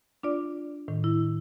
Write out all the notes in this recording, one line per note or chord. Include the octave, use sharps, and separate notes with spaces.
D4 F4 D5
A2 D#3
E4